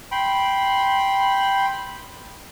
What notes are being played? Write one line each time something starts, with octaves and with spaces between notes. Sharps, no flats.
G5 B5 C6